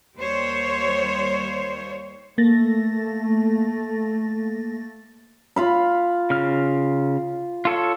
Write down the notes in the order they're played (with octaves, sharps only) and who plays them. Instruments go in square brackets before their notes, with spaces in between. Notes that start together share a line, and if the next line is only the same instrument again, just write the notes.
[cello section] D#2 G3 C5 C#5
[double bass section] A3 [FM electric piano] A#3 A6 A#6
[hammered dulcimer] F4 F5 B5
[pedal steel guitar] C#3 F6
F4 A4 C#5